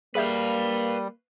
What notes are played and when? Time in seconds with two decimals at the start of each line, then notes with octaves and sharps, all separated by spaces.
0.15 G3 A#3 G#4 B4 E5 F5 G6